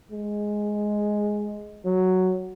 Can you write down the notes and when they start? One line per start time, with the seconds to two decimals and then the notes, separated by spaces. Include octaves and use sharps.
0.11 G#3
1.85 F#3